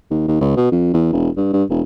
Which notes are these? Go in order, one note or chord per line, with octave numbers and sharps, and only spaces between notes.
D#2
D#2
C#2
B2
F2
E2
E1
G2
G2
E1